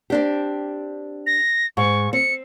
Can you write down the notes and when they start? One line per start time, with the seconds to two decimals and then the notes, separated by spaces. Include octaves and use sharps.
0.10 C4 D4 G4
1.26 A#6
1.77 G#2 C#6
2.13 C4 C#7